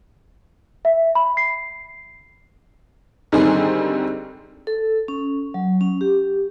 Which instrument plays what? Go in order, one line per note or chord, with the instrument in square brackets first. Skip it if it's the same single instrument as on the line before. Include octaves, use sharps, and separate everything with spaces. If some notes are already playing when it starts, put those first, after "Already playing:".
[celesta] E5
B5
C7
[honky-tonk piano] G#2 D3 D#3 G3 C4 G#4
[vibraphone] A4
C#4
F#3
C#4
G4